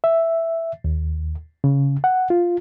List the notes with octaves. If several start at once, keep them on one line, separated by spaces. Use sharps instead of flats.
E5
D#2
C#3
F#5
F4